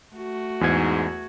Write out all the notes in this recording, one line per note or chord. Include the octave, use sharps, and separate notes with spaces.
A3 F#4
E2 G#2 G#6